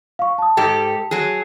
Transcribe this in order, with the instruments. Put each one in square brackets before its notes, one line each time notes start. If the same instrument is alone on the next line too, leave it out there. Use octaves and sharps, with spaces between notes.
[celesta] F5 C#6
A5 D#6
[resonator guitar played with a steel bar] G#2 G4 A4
F#3 G#4